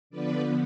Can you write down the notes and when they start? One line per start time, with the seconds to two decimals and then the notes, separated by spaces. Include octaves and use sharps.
0.10 D3 F3 B3 B4 D5